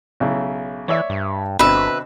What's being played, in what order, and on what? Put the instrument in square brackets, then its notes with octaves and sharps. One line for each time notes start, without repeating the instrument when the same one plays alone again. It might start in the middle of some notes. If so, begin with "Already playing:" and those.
[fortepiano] B1 C#3 E4
[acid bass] E3 [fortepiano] C#5 D5 E5
[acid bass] G2
[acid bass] G1 [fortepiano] B2 D3 C4 [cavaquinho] B4 E5